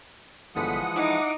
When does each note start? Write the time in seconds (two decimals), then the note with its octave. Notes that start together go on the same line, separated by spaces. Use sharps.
0.56 G1 D3 E3 F3 G#3 F#5 D#6 B6
0.96 D#4 E4 D6 D7